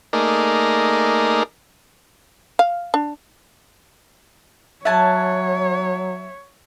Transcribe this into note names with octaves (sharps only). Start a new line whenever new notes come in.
A3 A#3 D#4 G#4 A#4 D5
F5
D4
F#3 C#5 E5 F#5 G#5 A5